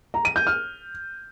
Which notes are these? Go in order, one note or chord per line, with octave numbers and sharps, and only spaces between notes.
A#5
D#7
G6
F6